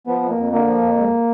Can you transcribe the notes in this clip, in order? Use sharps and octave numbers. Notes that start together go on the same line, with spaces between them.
F3 B3
F2
A#3
F2
D3 A#3
F3
F2
G#2